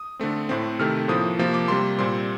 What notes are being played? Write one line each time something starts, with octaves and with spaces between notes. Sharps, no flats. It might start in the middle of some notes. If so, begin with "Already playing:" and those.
Already playing: D#6
D3 A3 C4
A2 A3 C4
C3 D#3 A3 C4 F6
A2 F3 A#3 D#6
C3 F3 A#3
D6
C3 G3 A#3 C6
A#2 G3 C4 C6